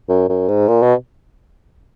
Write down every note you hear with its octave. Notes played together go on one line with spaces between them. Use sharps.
F#2
F#2
G#2
A#2
B2